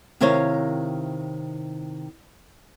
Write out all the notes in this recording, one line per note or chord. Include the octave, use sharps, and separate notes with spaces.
C3 D#3 E4 C5 C#5 F5